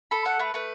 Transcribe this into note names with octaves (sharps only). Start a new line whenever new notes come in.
A4 B5
A3 F#5
A3 B4
A3 B4